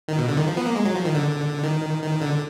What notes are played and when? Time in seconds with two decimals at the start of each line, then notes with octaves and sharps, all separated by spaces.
0.08 D#3
0.18 B2
0.28 D3
0.37 D#3
0.48 F3
0.57 B3
0.66 A#3
0.76 G#3
0.85 F#3
0.95 F3
1.05 D#3
1.14 D3
1.64 D#3
2.03 D#3
2.22 D3